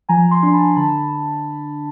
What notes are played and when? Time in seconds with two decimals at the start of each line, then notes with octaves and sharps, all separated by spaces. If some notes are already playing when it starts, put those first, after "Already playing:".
0.09 F3 G#5 A#5
0.31 A#5 C6
0.43 D4 C6
0.53 A5 B5
0.76 D3 A5 B5